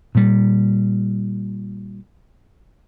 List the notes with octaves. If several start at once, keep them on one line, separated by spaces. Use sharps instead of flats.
A#2 G3